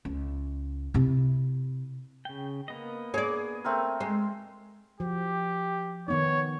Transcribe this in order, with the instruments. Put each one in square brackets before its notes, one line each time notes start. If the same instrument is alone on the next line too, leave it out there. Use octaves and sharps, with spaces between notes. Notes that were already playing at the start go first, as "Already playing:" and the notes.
[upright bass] C#2
C3 E4
[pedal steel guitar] C#3 G5
A#3 B3 D#5
[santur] G#4 [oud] C#5 D5
[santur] A3 C4 A#4
[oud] G#3
[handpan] F3 F#4 [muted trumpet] G4
[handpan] D#3 B3 D#4 [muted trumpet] C#5